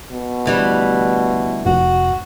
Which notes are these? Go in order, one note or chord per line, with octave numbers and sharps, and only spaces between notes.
B2
D2 E3 G3
F1 F#4